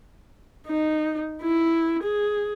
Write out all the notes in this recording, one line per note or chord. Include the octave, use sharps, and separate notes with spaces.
D#4
E4
G#4